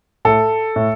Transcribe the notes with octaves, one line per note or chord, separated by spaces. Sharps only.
A2 A4
A2